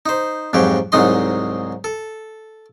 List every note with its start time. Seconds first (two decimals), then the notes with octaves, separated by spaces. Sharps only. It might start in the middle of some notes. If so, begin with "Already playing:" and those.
0.06 D#4 C5
0.53 F2 G#2 F#3 G4
0.92 C2 G#2 F#3 D#4 D#5 C6
1.84 A4